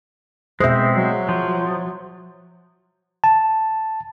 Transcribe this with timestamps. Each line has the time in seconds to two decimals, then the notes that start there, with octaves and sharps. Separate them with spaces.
0.60 B2 G#3 C4 C5 E5
0.95 F#3
1.29 F3
3.24 A5